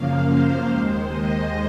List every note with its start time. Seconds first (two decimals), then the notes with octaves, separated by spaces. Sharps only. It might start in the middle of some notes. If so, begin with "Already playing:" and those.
Already playing: F#2 C#3 F3 A#3 F5
0.24 C5
0.66 D#2 D#3 G#3 C5
1.09 D#5